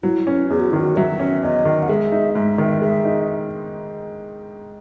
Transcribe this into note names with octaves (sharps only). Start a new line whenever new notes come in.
F#3 E4
C#4
E2 G#4
F#4
D#3 E4
F#4
F#3 E5
C#4
E2 D#5
D#3
F#5
G#3 E5
D#4
G#2 E5
D#3
G#3 E5
D#4